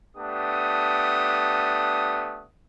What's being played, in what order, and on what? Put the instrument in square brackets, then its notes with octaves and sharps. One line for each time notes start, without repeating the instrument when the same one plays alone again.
[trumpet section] A3 B3 D4 G4 D#6